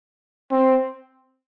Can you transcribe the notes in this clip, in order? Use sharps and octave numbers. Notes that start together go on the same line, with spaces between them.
C4